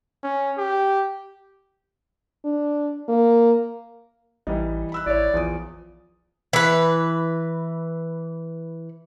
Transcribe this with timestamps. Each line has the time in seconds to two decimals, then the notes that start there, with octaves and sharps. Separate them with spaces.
0.23 C#4
0.58 G4
2.45 D4
3.09 A#3
4.47 A1 E3 G3 D#4
4.92 B5 E6 F#6
5.06 A1 E4 C#5 D5
5.34 A#1 E2 F3 D#6
6.53 E3 B4